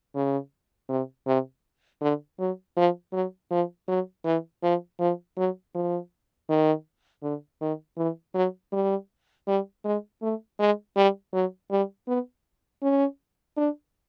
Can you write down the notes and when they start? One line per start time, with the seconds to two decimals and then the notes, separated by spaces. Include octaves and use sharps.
0.15 C#3
0.89 C3
1.27 C3
2.01 D3
2.39 F#3
2.77 F3
3.13 F#3
3.51 F3
3.88 F#3
4.25 E3
4.63 F3
5.00 F3
5.37 F#3
5.75 F3
6.49 D#3
7.23 D3
7.61 D#3
7.97 E3
8.35 F#3
8.72 G3
9.47 G3
9.85 G#3
10.22 A3
10.59 G#3
10.96 G3
11.33 F#3
11.71 G3
12.08 B3
12.83 C#4
13.57 D4